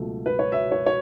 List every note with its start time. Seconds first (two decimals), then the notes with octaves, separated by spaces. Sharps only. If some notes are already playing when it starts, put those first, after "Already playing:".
Already playing: C#2 B2 F#3 A3
0.26 B4
0.39 C#5
0.52 E5
0.71 C#5
0.86 C#5